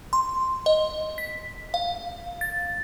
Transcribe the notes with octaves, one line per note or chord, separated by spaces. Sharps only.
C6
D#5
B6
F5
A6